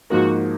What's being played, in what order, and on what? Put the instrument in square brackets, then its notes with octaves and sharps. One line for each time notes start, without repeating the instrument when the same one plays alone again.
[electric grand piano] G#2 F3 A#3 D#4 A#4 [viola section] F#4